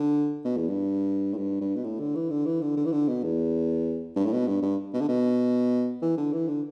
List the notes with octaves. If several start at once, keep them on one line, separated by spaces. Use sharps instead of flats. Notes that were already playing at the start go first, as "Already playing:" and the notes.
Already playing: D3
B2
E2
G2
A2
G2
G2
B2
A2
D3
E3
D3
E3
D3
D3
E3
D3
B2
E2
G2
A2
B2
G2
G2
B2
D3
B2
E3
D3
E3
D3